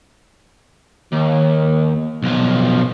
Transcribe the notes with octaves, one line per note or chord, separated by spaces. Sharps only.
D#2
B1 F3